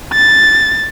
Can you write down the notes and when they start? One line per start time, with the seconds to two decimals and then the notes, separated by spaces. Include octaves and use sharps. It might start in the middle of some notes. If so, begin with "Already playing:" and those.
0.13 A6